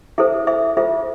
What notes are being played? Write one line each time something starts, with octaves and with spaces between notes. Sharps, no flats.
E4 A4 C5 E5
E5
F4 A4 C5 E5